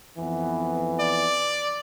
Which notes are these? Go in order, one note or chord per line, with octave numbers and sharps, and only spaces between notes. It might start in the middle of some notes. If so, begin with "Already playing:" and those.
F2 E3 B3
D5